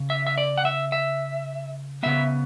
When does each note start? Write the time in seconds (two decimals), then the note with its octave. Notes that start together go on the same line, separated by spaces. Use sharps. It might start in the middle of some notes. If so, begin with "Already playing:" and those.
Already playing: C#3
0.10 E5
0.27 E5
0.38 D5
0.58 F#5
0.65 E5
0.92 E5
2.03 C#3 E3 B3 E5